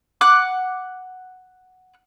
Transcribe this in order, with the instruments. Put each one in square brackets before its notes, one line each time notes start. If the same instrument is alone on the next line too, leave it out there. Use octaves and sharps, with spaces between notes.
[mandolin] F#5 D6 F#6